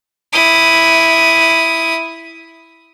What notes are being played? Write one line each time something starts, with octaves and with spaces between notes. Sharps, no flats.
E4 D#6